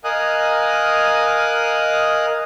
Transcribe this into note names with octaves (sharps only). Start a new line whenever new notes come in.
A#4 D#5 F5 G#5 D#6 F#6